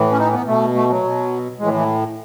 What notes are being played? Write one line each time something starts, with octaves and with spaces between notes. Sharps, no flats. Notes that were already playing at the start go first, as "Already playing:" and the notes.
Already playing: A2 E3
C#4
D#4
B3
B2 A3
A3
F#3
B2
A2 E3 G#3
E3